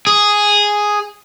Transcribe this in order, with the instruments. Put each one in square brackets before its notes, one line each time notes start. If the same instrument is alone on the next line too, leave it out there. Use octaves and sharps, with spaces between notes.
[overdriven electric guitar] G#4